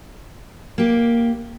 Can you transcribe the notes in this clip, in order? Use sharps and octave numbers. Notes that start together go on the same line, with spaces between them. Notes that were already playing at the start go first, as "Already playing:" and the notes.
A#3 G4